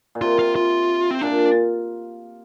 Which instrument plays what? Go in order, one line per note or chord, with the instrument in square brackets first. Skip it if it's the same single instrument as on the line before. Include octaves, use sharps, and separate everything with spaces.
[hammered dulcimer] A#2
[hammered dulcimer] C3 [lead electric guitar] F4
[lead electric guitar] F4
F4
C4
[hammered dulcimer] A#2 [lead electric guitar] D4